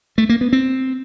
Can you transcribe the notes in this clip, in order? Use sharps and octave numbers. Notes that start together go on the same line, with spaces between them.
A3
A#3
B3
C4